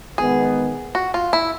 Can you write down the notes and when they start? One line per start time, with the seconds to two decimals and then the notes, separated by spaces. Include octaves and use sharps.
0.18 D#3 G#3 B3 G#4
0.95 F#4
1.14 F4
1.33 E4